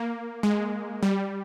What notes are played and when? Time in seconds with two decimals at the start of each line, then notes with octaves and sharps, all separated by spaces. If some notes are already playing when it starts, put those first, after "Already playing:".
Already playing: A#3
0.43 G#3
1.03 G3